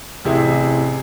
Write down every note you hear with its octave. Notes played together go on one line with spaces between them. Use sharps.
A1 C3 E4 G#4